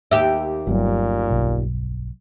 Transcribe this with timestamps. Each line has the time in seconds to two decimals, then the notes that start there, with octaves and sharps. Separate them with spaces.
0.11 D#2 G4 E5
0.67 G1 G2 A#2 F#3
1.31 B1